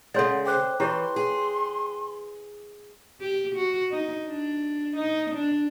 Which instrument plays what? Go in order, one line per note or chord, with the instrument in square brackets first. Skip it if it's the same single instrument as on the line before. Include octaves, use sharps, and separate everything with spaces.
[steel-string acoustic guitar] C#3 G#3 [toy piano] A4 C#5 D5 [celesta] F#5 C6 A6
[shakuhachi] C5 [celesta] G5 D6 F#6
[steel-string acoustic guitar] E3 [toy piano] E4 G4 C#5 [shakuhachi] C6
[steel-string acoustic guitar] G#4
[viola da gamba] G4
F#4
D#4
D4
D#4
D4